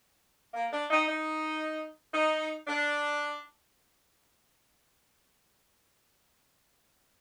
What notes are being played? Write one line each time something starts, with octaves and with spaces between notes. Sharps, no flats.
A#3
D4
D#4
D#4
D#4
D4